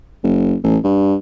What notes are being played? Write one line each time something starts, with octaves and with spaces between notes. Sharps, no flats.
F#1
A1
G2